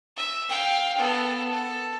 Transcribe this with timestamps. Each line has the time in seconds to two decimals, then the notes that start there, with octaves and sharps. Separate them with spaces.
0.16 E5
0.49 F5 G5
0.97 B3 A4
1.52 A4